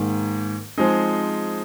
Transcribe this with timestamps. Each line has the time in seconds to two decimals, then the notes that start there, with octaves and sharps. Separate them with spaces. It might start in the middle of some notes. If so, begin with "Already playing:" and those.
Already playing: G#2 D#3 A#3
0.78 F3 G#3 C4 D#4 G#4